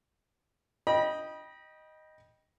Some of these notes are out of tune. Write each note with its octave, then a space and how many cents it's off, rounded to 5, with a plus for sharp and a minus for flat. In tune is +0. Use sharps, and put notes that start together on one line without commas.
D#5 +0 G5 +0 B5 -35